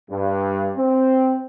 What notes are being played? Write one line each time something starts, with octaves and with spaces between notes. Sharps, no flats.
G2
C4